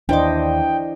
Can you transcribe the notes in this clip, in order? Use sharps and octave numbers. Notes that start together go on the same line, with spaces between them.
D#2 E3 D4 C5 D#5 G5 D6